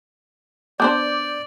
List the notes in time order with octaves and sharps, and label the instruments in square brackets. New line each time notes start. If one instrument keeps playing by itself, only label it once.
[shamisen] B3 D4 C5 [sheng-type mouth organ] D5 [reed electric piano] D6 G6